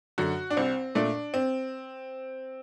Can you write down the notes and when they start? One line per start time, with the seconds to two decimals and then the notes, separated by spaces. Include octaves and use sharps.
0.18 F#2 D3 F#4
0.50 D4
0.57 C2 C4
0.95 A#2 A3 D4
1.34 C4